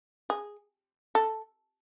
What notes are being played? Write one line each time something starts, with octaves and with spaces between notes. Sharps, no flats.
G#4
A4